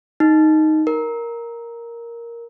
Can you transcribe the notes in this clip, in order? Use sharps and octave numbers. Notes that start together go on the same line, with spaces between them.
D#4
A#4